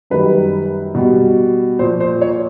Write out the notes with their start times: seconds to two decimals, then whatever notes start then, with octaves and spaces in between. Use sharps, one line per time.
0.10 F#2 D#3 G3 B4
0.95 B2 G3
1.79 A#2 C5
1.82 F3
2.00 C5
2.21 C#5